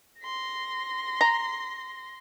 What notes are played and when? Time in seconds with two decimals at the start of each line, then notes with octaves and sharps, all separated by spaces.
0.21 C6 A#6
1.21 A#5